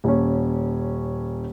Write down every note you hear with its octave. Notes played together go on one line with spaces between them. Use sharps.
D#1 C#4